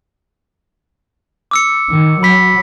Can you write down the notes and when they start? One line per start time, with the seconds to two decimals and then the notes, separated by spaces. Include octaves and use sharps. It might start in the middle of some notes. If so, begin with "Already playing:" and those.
1.51 D6 E6 C#7
1.90 D#3
2.23 F#3 B5 B6